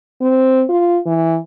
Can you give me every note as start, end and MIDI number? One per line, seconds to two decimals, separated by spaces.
0.21 0.63 60
0.69 0.99 65
1.06 1.38 52